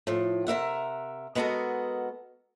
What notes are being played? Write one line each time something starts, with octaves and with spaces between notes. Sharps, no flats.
A2 F3
C3 A#4 E5 F#5
G#3 B3 E4 F#4 A4 A#4